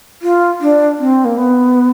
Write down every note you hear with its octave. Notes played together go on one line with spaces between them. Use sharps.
F4
D4
C4
A#3
B3